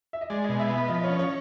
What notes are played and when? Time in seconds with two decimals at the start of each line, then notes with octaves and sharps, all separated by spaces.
0.13 E5
0.21 D#5
0.30 G#3 D5
0.44 B2 D#5
0.59 E5
0.70 B3 E5
0.88 F3 D#5
1.04 C#4 C#5
1.19 C#5